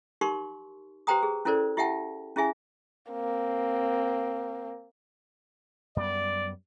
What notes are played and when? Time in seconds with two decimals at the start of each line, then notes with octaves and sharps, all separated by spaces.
0.21 D#4 G4 A#4 C6 C#6
1.07 G4 B4 C5 G5 A#5 D#6
1.23 G#4
1.45 C#4 E4 A4 A#4 C5 D5
1.77 E4 G4 E5 F#5 G5 A5
2.36 C#4 E4 G#4 E5 G#5
3.11 A#3 C4
5.96 F#2 G3 B3 D5